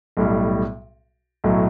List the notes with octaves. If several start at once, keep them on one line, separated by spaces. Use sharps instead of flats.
B1 A2 G3
B1 A2 F#3